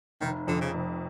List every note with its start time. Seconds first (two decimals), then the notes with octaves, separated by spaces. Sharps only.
0.21 F1 D#3
0.47 F2 D3
0.61 C#3
0.74 F1